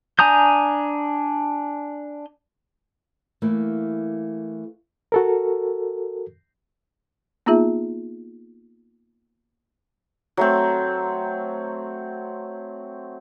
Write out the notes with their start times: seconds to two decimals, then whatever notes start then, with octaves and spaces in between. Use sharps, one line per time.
0.19 D4 G#5 A#5 D#6 G6
3.42 E3 A3 A#3
5.12 F#4 A4 A#4
7.46 A#3 B3 D#4 F4 G#4 E5
10.37 F#3 A3 C4